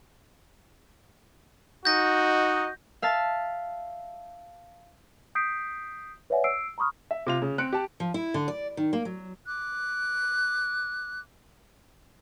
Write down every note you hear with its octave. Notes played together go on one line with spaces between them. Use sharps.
D#4 F#4 D#5 G6 A#6
E5 F5 A5 A6
D#6 G6 B6 C7 D7
B4 C#5 D5 E5 F#5 G#5
E6 C7 D7
A#5 B5 C#6 D#6 F6
E5
C3 F4 F7
C#3
C4 F#6 C#7 D7
G4 A5
F3
E4
D3
D5
D#3
A#3
F#3
D6 F#6